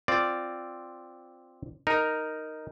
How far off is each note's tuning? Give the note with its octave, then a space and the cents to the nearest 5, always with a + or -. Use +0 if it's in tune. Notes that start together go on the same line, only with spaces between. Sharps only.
C4 +0 F4 +0 D5 +0
D#4 +0 A#4 +0